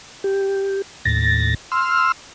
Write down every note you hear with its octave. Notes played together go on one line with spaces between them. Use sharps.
G4
D#2 A2 A6 A#6
C6 E6 F6